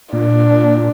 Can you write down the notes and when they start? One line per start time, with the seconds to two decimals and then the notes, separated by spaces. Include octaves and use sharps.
0.13 A#2 D4